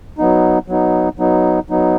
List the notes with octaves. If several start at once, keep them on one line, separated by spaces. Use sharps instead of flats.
F#3 B3 D#4
F#3 B3 D#4
F#3 B3 D#4
F#3 B3 D#4